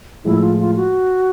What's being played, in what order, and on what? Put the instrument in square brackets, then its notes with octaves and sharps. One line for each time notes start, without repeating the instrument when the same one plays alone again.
[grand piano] A2 F3 G#3 [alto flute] E4
[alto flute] F4
F4
F#4